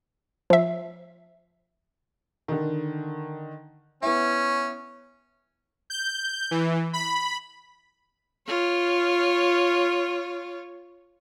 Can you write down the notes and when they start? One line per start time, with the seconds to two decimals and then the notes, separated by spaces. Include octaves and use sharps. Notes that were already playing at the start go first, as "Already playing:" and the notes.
0.50 F3 E5
2.48 D3 D#3
4.02 B3 C#4 E4
5.90 G6
6.51 E3
6.93 B5
8.47 F4 C#5